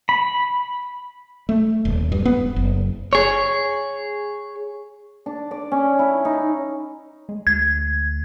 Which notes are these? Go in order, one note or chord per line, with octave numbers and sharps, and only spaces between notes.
B5
A3
D#1
G2
B3
F#1
G#4 C#5
D4
D5
C#4
E4
D#4
G#3
D2 G#6